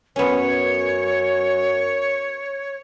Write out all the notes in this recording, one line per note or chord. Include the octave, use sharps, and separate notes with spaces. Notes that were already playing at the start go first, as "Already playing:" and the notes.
F#2 B3 C#4 C#5